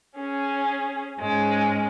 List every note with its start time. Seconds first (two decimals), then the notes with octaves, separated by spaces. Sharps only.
0.17 C#4 G#4
1.19 G#2 G#3 C#4